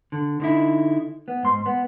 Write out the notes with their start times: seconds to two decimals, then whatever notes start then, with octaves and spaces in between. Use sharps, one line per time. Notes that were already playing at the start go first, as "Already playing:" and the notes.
0.12 D3
0.40 D3 D#4 E4
1.28 B3
1.43 G#2 C6
1.66 B3